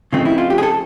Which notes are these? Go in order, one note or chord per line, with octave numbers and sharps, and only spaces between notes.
C#3 F3 A3 C4 D#4
E4
F4
G4
G#4
A4